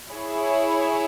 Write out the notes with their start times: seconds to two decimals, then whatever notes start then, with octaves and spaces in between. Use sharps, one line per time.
0.13 E4 G#4 C#5